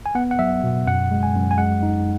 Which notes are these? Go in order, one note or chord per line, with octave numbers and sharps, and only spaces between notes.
G#5
B3 F#5
F#5
F#3 E5
B2
F#2 F#5
G#3
G#5
F#2
G#5
G#3 F#5
D#4